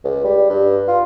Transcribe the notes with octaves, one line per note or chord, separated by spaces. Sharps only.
C#2
G3
G2
F4